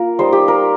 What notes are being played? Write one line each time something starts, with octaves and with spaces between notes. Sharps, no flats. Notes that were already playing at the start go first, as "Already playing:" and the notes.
Already playing: A#3 F4 A#4
G3 D#4 C5
G4
A#4